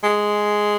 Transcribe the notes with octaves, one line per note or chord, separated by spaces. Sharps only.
G#3